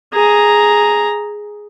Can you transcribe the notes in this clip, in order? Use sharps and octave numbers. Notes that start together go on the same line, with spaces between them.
G#4 A#5